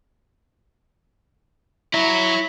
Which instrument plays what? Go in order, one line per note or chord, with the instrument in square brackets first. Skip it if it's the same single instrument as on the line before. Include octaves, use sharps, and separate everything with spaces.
[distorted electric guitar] F#3 [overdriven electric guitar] E4